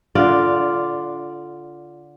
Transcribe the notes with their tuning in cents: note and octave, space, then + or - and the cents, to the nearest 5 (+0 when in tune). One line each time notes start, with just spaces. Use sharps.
D3 -20 F4 -5 D5 +0